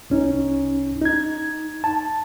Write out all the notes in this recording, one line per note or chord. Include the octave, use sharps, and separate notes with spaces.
C2 C#4 D#4
D#4 G#6
A5